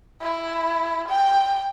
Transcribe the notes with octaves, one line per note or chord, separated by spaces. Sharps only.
E4
G5